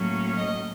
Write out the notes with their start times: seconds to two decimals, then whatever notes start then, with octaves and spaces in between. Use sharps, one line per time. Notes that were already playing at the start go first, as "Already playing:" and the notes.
Already playing: A2 F#3 A#3 C#4
0.37 D#5